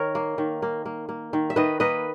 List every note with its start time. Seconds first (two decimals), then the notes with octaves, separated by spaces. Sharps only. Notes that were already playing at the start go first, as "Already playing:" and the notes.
Already playing: D#3 A#4 C#5
0.15 A#3
0.38 D#3
0.62 A#3
0.86 A#3
1.09 A#3
1.33 D#3
1.50 E5
1.56 D#3 B4 D#5
1.80 A#3 B4 D#5